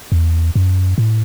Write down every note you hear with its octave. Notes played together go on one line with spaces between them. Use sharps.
E2
F#2
A2